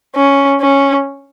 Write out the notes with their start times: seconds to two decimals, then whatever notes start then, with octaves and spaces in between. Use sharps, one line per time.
0.15 C#4
0.61 C#4